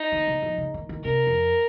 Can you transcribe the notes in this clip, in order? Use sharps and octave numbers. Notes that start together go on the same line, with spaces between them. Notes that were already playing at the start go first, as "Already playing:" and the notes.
Already playing: D#4
D#3
C#3
F3
C#3
D#3
D#3
C3 A#4
F2